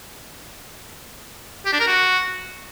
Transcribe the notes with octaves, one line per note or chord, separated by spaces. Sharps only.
G4
D4
A#4
F#4